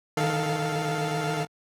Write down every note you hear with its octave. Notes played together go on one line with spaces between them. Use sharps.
D#3 A4 F5